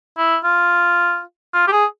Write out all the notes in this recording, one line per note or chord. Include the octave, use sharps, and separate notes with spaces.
E4
F4
F4
G4
G#4